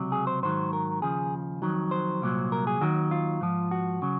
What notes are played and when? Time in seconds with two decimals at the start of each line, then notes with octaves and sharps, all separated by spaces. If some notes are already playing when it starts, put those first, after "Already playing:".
Already playing: C#2 C3 F#3
0.12 G#4
0.27 C5
0.43 G#2 D#3 F#3 C5
0.73 A#4
1.02 D#2 C#3 F3 G#4
1.62 F2 D#3 F#3
1.91 C5
2.22 C2 A#2 F#3
2.52 A#4
2.67 G#4
2.81 D#2 D#3 F#3 F#4
3.11 F4
3.41 G#2 F3
3.71 F#4
4.02 C#3 F#3